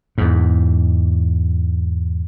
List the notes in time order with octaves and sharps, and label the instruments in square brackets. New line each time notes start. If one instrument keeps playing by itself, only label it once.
[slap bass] E2 G#2